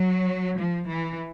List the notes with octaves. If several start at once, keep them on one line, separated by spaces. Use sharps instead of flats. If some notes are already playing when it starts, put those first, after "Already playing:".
Already playing: F#3
F3
E3